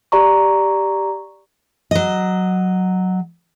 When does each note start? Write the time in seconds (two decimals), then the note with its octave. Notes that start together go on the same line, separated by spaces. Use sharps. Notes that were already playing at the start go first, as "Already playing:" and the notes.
0.12 G4 D5 A#5 C#6
1.91 F#3 D#5